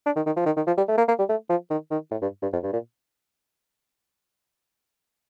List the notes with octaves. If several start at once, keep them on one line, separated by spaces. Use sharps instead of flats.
D4
D#3
D#3
F3
D#3
D#3
F3
G3
A3
A#3
A#3
G3
A3
F3
D#3
D#3
A2
G2
G2
F2
G2
A#2